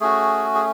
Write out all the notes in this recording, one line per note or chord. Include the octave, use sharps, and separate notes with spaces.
A3 C#4 F#4 G#4
G#4